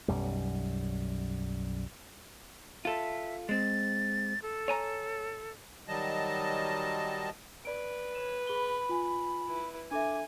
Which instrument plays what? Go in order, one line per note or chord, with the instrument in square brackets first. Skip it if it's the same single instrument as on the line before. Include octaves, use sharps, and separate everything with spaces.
[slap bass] B1 F#2 G3
[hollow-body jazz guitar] F4 A4 [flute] E5
[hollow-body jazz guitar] G#3 C4 [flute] A6
[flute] A4
[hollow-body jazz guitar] C#5 G#5 A#5
[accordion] D#3 F#3 G3 D#5 A5
[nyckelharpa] B4 [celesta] D5 D7
[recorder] C#5 [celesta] E7
[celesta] G#4 G7 [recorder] B5
[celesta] F4 G#5
[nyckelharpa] E4 B4
[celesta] D4 A4 E5 [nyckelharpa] G#5 [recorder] D6